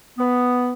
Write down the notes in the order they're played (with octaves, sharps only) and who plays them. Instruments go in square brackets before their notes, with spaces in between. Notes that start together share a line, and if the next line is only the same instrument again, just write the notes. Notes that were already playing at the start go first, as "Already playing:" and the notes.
[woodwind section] B3